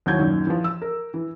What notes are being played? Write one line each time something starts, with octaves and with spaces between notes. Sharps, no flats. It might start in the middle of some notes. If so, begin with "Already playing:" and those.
D#2 F#3 E4 G6 G#6
F#2 A#2 D#3
E3 F3
E6
A#4
E3